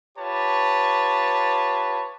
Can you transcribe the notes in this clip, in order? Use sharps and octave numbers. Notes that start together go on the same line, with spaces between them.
F4 G4 B4 C#5 A5